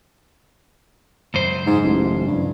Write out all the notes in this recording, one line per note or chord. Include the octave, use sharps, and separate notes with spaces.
C#2 F#2 C5
G#2
A1
G2